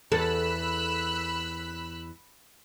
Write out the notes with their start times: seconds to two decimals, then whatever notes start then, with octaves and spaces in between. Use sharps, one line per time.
0.12 E2 A4 B5 E6 F#6